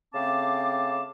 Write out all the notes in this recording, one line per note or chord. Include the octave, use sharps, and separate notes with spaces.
C#3 A3 C4 F5 A5 D6